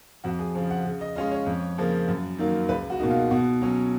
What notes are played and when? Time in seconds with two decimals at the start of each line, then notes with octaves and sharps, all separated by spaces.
0.24 F2 F#4
0.39 G#4
0.55 C#3 F3
0.70 F#5
0.85 C#3
1.01 D#5
1.16 G#3 C#4 F4 D#5
1.32 C#5
1.46 F2
1.78 C#3 F3 A#3
2.08 F#2
2.38 D#3 F#3 A#3
2.69 C#2 B4
2.90 F#4
2.99 B2 A#3 D#4
3.10 F4
3.31 B2 F#4
3.61 F#3 C#4